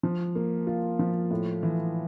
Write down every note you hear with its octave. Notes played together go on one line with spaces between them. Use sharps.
F3
A#3
F4
F3
A2
E3